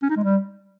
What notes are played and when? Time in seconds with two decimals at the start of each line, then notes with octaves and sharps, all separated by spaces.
0.03 C#4
0.10 D#4
0.17 G#3
0.24 G3